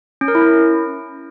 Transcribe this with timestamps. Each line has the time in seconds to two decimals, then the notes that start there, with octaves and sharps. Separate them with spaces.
0.21 C#4
0.28 A#4
0.35 E4
0.42 C#4